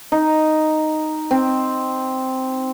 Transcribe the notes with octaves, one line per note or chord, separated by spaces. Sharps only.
D#4
C4